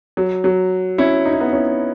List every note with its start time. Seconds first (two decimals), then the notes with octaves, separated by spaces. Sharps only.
0.17 F#3
0.44 F#3
0.98 C#4 E4
1.26 D#4
1.33 E4
1.40 B3 D#4
1.53 C#4 E4